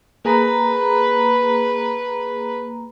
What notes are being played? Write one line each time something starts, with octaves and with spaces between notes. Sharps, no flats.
A#3 G#4 B4 A#5